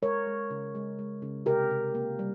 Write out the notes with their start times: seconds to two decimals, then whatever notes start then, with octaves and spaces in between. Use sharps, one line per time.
0.02 G#3 A#4 C#5
0.26 G#3
0.50 C#3
0.75 G#3
0.99 G#3
1.22 C#3
1.46 C3 G4 A#4
1.71 C3
1.95 A#3
2.19 G3